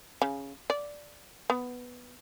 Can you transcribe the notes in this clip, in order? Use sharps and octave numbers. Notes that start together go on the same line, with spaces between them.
C#3
D5
B3